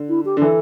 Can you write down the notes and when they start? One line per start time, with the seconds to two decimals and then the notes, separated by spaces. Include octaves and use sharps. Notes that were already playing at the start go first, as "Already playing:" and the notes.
Already playing: D3
0.09 E4
0.25 G4
0.37 D3
0.42 E3 A4